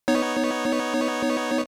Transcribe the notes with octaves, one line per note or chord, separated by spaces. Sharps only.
B3 D#4 C#5